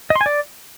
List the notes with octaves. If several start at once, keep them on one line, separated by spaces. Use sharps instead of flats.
D#5
C6
G#5
D5